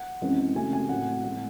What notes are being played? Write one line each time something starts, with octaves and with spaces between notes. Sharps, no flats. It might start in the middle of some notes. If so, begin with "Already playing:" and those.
Already playing: F#5
F#2 E3 G#3 C4
C#3 F#3 A3 C4 G#5
G#5
A2 F#3 C4 F#5
A2 G#3 C4 F#5